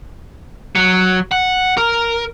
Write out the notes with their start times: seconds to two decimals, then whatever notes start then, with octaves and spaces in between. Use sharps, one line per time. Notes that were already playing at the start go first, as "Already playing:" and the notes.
0.75 F#3
1.31 F#5
1.77 A#4